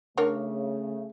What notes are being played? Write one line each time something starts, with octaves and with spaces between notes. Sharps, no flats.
C#3 A3 D4 A#4 C#5